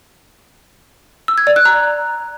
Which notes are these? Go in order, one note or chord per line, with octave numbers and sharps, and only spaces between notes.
E6
G#6
D5
F#6
A#5